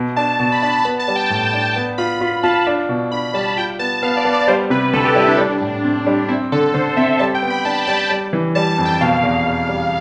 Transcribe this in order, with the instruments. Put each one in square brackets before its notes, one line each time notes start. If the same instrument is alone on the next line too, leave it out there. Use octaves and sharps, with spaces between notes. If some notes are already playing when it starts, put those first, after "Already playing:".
Already playing: [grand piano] B2
[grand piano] D4 [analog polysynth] A5
[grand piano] B2
[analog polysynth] B5
[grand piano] D4 [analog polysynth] A5
[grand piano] B3 [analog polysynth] B5
[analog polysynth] A5
[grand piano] G3
[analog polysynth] G5
[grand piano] A2 [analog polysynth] A5
[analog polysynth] A5
[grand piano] D4
[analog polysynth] A5
[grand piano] B3 [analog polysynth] A5
[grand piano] F4 [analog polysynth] B5
[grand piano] F4 [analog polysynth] B5
[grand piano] F4 [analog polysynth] A5
[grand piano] D4
B2
[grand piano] D4 [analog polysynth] B5
[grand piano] G3 [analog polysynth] A5
[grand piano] F4 [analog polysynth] G5
[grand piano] B3 [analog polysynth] A5
[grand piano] B3 [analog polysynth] F5
[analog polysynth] D5
[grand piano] B3
[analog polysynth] D5
[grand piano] G3 [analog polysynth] C5
[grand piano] C3 [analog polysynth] B4
[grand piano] D2 [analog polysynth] A4
[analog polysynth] G4
[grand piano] G3 [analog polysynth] E4
[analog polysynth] D4
[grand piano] G3
A2
C4
G3
[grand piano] C4 [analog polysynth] E4
[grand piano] D3 [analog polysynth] A4
[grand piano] D3 [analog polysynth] C5
[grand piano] C4 [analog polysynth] E5
[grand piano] G3 [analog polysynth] A5
[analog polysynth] G5
[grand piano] B3
[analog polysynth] B5
[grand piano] D4 [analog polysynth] A5
[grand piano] G3 [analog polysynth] A5
[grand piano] G3
E3
[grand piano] G3 [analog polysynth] A5
[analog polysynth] A5
[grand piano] F2
[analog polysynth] G5
[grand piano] B2 [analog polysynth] F5
[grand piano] E2
E2
G3